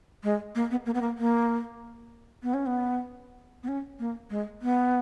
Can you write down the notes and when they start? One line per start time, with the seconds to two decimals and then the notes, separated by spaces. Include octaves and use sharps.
0.24 G#3
0.55 A#3
0.71 B3
0.86 A#3
0.94 B3
1.01 A#3
1.18 A#3
2.43 B3
2.54 C#4
2.66 B3
3.63 B3
3.68 C#4
3.99 A#3
4.30 G#3
4.62 B3